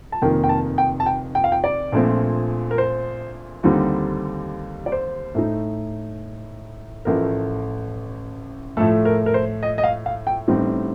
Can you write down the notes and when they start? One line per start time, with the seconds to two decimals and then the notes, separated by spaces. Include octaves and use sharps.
0.12 A5
0.22 F1 F2 D#3 A#3 G5
0.44 G5
0.49 A5
0.78 G5
1.00 A5
1.06 G5
1.35 G5
1.44 F5
1.52 G5
1.64 D5
1.92 A#1 A#2 F3 A3 C4
2.71 A#4
2.78 C5
3.63 D#2 D3 G3 C4 D#4
4.86 D5
4.92 C5
5.35 A2 A3 D#4
7.05 A1 A2 F3 A3 A#4
8.77 A2 F3 A3 A4
9.05 A#4
9.26 A#4
9.34 C5
9.63 D#5
9.78 D#5
9.84 F5
10.06 F5
10.27 G5
10.48 A1 A2 G3 C4 D#4